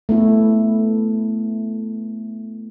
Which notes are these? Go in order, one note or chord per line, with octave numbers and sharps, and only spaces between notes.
A3 B3 E4